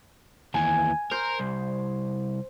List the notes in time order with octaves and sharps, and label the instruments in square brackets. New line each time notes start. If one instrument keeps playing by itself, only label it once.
[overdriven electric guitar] D#2 E3 [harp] G#5
[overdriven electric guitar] A#4 [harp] C5
[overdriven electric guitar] C2